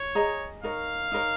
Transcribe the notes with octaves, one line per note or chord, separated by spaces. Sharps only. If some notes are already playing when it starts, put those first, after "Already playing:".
Already playing: C#5
G#4 D#5 A#5
D#4 A#4 C#5 F5
D#4 A#4 C#5